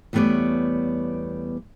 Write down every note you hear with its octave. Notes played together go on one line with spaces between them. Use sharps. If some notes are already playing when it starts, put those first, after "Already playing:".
E2 G3 A3 B3 C#5 D5